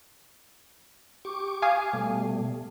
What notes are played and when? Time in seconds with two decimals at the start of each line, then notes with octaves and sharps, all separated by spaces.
1.25 G4 C#6 D6
1.62 F5 G#5 D#6
1.93 B2 G3 A3